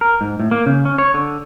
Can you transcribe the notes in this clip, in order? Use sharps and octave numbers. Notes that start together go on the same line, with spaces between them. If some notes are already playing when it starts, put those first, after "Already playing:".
A#4
G#2
A2
A#3
C#3
C#4
C#5
D3